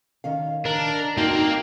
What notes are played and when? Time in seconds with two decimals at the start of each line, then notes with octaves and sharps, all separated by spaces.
0.24 D#3 C#4 F5
0.65 D4 A#4
1.18 A#3 C4 D#4 F#4